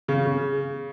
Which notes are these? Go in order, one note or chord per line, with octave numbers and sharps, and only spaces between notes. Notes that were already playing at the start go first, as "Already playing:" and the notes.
C#3
C#3